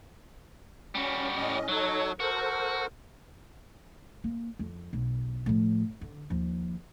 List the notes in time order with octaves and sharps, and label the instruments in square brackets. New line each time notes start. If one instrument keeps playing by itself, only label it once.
[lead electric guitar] G3 F#4 [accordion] C#4
[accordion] A2 C#4 D#5
[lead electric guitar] F#3 [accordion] D#4 A4 C#5
[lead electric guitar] F#4 [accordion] A4 A#4 C5
[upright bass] A#3
F2
B1
A2 F3
D3
D#2 F3